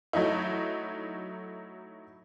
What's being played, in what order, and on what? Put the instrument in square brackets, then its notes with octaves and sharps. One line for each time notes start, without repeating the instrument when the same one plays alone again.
[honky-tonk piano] F#3 A3 D#4 E4